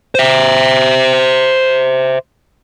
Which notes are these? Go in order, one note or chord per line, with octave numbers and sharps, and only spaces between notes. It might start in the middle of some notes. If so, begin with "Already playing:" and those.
C5 E5